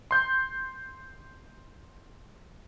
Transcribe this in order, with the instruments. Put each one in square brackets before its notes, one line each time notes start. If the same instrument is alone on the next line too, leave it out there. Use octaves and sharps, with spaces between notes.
[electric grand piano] C6 G6